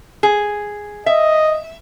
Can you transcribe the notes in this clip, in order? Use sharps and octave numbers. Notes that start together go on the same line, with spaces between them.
G#4
D#5 E5